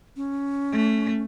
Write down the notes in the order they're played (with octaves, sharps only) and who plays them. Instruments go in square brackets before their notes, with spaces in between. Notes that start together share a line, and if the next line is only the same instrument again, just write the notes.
[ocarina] C#4
[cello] A3